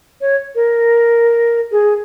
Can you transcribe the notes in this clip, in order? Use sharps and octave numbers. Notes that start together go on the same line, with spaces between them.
C#5
A#4
G#4